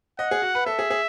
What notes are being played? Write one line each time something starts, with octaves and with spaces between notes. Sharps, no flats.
D#5 F#5
G#4
F#4
B4
A4 E5
G#4
G#4